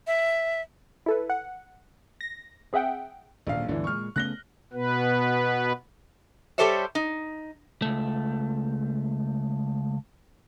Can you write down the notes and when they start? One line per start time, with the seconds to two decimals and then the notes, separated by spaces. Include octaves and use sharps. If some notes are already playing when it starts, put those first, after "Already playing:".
0.07 E5
1.06 E4 A4 B4
1.30 F#5
2.21 A#6
2.73 C4 G#4 E5 F#5 G5
3.47 D#1 A#1 D3 F5
3.69 G1 D2 G2 D3 E3
3.84 A#2 G#3 C#6 F6
4.16 C#3 A3 B3 F#6 A#6 G7
4.73 B2 B3 B4
6.58 G3 G4 A4 C5 C#5 E5
6.95 D#4
7.82 C#2 A3